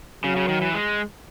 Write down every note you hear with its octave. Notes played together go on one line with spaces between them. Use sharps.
C#3 F#3
C#3
D#3
E3
G#3